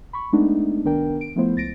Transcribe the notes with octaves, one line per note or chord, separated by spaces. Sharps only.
B5 C#6
G#3 A3 B3 D4 D#4
C2 D#3 B3 D4 A#4 G5
D7
F3 A3 B3 E4 C5
C#2 A6 A#6 D7